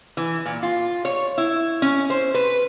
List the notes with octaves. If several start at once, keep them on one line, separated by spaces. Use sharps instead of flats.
E3
A#2
F4
C#5
E4
C#4
C5
B4